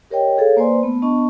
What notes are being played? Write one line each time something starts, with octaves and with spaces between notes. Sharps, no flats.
G4 A#4 C#5 D#5 G5
G#4 A4 C#5 F5
A#3 B4 C5 D5 G#5 C6
A3 B3
B3 D4 D#5 A5 C#6